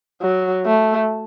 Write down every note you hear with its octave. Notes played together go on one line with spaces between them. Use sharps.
F#3
A3